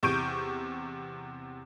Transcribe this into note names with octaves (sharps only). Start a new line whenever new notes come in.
E2 C3 C#6 G6 D7 D#7